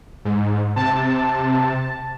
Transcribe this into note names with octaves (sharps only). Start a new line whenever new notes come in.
G#2
C3 A5